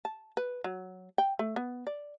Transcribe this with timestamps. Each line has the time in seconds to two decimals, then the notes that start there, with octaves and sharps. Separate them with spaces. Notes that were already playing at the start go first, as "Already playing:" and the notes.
0.05 A5
0.37 B4
0.64 F#3
1.18 G5
1.39 A3
1.56 B3
1.87 D5